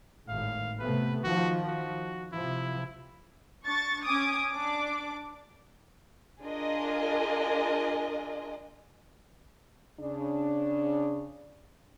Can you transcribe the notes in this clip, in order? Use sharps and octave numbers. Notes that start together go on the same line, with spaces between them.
G#1 A2 F5
C3 A3 B3 B4
D#3 F3 F#4
F#4
C3 F3 E4
D4 C#6 A6
C#4 G#5 D6 D#6
D4 D6
D4 F4 G#4 A#4 D#5 G#5
C#3 D4